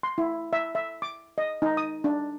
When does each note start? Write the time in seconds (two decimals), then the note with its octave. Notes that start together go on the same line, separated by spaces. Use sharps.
0.03 C6
0.18 E4
0.53 E5
0.75 E5
1.02 D6
1.38 D#5
1.62 D#4
1.77 D#6
2.04 D4